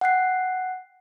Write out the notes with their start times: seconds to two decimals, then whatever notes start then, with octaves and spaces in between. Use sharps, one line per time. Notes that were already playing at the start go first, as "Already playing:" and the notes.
0.01 F#5 G5 F#6 C7